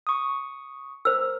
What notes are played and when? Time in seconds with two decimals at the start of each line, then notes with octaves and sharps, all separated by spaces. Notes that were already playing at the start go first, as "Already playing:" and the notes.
0.07 C#6 D#6
1.05 A#4 C5 E6